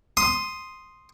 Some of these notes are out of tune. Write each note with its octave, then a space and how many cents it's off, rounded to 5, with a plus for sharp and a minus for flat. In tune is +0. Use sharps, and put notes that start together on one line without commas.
C6 +0 D#6 +0